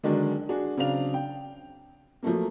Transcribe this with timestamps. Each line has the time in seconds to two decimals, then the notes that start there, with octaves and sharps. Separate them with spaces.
0.04 D3 D#3 F#3 G#3 D4
0.49 D4 F#4 G#4
0.77 C#3 F#3 C4 D4 F5 F7
1.14 G5
2.23 F3 F#3 A3 A#3